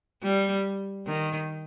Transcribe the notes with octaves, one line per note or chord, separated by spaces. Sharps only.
G3
D#3